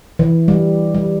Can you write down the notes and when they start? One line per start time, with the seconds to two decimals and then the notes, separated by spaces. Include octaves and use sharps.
0.19 E3
0.48 G3
0.95 G3